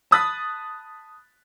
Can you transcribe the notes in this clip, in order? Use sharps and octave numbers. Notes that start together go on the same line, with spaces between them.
A5 B5 D#6 F#6 A6 B6